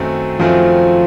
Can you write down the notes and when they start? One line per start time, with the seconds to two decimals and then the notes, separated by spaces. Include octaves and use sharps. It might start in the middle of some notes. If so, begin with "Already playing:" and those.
Already playing: F#2 D#3 F#3 A3 C4
0.40 F#2 D#3 F3 F#3 A3 C4